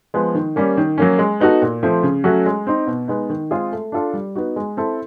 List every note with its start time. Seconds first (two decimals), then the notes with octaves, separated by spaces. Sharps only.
0.14 F3 G#3 B3
0.35 D#3
0.56 G3 A#3 C#4
0.77 D#3
0.98 F#3 A#3 C#4
1.19 G#3
1.40 B3 D#4 F#4 A4
1.62 A#2
1.83 F3 A3 C4
2.03 C#3
2.24 F#3 A3 C#4 F#4
2.46 G#3
2.67 C4 D#4
2.87 B2
3.08 G#3 B3 D#4
3.30 D#3
3.51 G#3 C4 F4 G#4
3.72 A3
3.92 D4 F4 A4
4.13 G3
4.35 B3 D#4 F#4
4.56 G#3
4.77 C4 E4 A4